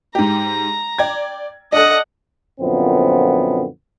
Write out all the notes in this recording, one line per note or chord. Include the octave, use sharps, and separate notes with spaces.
G#2 G4 A#5
D5 G5 G#6
D4 A4 D#5 F#5
F#2 A#2 D3 F3 B3 C4